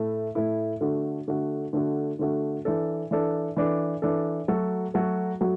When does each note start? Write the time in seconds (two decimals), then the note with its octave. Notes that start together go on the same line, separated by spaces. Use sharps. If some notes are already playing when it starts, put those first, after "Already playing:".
Already playing: A2 A3 E4
0.35 A2 A3 E4
0.81 D3 A3 F#4
1.28 D3 A3 F#4
1.73 D3 A3 F#4
2.19 D3 A3 F#4
2.65 E3 D4 A4
3.11 E3 D4 A4
3.57 E3 D4 A4
4.02 E3 D4 A4
4.48 F#3 A3 F#4 A4
4.94 F#3 A3 F#4 A4
5.41 F#3 A3 F#4